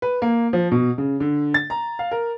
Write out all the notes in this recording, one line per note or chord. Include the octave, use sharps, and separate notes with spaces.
B4
A#3
F3
B2
C#3
D3
A6
A#5
F5
A#4